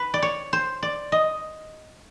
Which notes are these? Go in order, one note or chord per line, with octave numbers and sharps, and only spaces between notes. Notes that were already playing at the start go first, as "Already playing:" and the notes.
Already playing: B4
D5
C#5
C5
D5
D#5